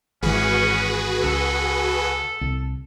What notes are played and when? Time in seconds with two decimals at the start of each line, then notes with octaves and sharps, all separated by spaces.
0.22 G#1 E3 C#4 F#4 G#4 B4
1.23 C#2 A4
2.41 C2